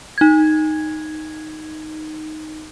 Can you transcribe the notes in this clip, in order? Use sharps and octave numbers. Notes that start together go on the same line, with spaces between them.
D#4 G#6